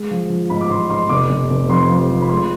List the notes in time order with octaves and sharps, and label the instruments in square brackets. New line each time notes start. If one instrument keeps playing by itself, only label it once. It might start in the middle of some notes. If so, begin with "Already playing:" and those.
Already playing: [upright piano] G#3
F3
F3
G#2 B5
D6
A1 C6
G#2 C6
F1 D6
F1
F1
F2 C6
F3
F3
B5
G#3 C6